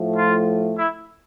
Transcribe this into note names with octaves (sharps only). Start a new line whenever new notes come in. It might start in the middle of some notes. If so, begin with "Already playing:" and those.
Already playing: A2 F3 A3
F4
E4